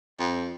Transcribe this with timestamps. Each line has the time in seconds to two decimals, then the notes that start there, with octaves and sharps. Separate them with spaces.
0.20 F2